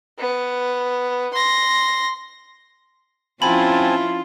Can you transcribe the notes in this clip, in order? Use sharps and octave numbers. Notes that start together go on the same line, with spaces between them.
B3
C6 A#6
F3 C4 C#4 E4 F4 G#5 A5 B5